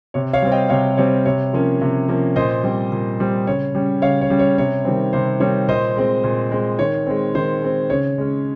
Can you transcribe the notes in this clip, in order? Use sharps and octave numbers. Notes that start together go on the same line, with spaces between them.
C3 C#5
C#5 F5
G3 C4
D#5 G5
C3 C#5 F5
G3 C4 C#5
C3 C#5
F3 A#3 C#4
C3
F3 A#3 C#4
A#2 C5 D#5
G3 C4
A#2
G3 C4
C#3 C#5
G3 C#4
C#3 C#5 F5
C#5
G3 C#4
C#5
C3 C#5
D#3 G3 C4
C3 C5
D#3 G3 C4 C#5
A#2 C5 D#5
G#3 C4
A#2
G#3 C4
D#3 C#5
G#3 C4
D#3 C5
G#3 C4
C#3 C#5
G#3 C#4